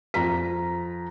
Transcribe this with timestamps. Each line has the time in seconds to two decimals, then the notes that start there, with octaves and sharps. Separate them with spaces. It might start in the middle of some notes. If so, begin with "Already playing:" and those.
0.14 F2 A#5 B6